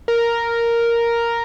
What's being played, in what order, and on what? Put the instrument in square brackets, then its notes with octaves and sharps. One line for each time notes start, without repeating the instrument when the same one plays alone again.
[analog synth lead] A#4